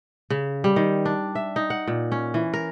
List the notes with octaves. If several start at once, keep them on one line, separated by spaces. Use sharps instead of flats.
C#3
G3
D#3
D4
E5
D#4
F#5
A#2
C#4
E3
A#4